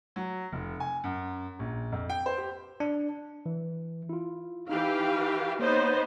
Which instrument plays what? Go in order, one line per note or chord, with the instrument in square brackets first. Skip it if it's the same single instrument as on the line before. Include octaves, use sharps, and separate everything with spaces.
[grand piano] F#3
F1
G#5
F#2
A#1
F2
G5
C5
G4
[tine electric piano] D4
E3
E4 F4
[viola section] E3 G4 F5 [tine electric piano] D#4
[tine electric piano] A#3 C#5 G6 [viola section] B3 D#4 C5